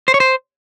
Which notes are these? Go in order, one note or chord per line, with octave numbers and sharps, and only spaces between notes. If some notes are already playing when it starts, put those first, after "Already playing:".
C5
C#5
C5